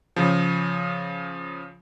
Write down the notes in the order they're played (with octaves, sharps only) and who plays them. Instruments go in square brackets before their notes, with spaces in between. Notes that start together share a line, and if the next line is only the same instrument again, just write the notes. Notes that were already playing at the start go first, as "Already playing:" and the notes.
[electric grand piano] C#3 F3